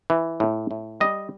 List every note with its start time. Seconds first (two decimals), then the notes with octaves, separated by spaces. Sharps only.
0.10 E3
0.40 A2
0.71 A2
1.00 G3 D#5